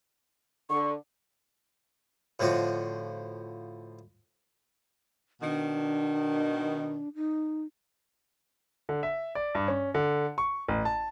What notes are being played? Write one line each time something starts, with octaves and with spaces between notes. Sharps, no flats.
D3 C#6
A2 D3 F3 F#4
B2 D#3 D4
D#4
D3
E5
D5
G2
C#4
D3
C#6
A1
A5